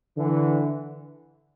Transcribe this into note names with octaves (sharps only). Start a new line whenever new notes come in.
D3 E3